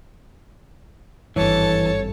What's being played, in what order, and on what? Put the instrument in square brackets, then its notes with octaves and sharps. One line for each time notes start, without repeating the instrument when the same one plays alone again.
[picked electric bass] G#1 G2 [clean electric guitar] E3 [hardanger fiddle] A4 A5 [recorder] C#5